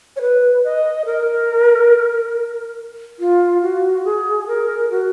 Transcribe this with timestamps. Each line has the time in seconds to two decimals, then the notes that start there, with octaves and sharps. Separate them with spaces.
0.16 C#5
0.21 B4
0.64 D#5
1.06 A#4
3.19 F4
3.62 F#4
4.05 G#4
4.47 A#4
4.90 F#4